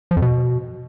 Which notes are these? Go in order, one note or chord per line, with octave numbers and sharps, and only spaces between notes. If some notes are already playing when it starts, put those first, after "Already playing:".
F3
F2
B2